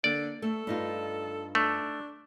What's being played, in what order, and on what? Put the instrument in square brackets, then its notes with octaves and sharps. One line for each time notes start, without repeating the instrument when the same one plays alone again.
[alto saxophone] D3 [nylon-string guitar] A#3 [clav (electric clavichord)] D5
[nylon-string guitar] A3 [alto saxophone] A4
[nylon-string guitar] G2 D#4 F4
[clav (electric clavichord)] A3 [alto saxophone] D4